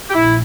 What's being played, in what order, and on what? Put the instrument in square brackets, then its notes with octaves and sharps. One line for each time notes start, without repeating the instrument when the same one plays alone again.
[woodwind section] G4
[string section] A#1 [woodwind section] E4